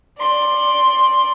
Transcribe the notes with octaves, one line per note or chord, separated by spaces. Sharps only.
D5 C6